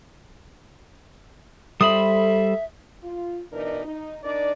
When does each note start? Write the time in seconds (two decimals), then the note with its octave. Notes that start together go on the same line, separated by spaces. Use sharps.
1.81 G3 A4 C5 E5 B5 D#6
3.03 F4
3.52 B2 E3 D4 D#4 A#4 D5
3.85 D#4
4.24 D4 D#4 A#4 D5